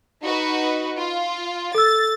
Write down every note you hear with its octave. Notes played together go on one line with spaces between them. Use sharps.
D#4 F#4 B4
F4
A4 E6 A6